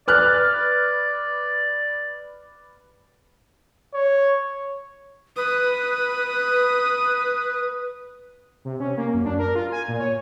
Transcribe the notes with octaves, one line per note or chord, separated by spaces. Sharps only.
B4 D5 F6 F#6
C#5
B4 D#6
C3
C#4
A#3
F#2
D4
A#4
F4
G#5
A#2
C#5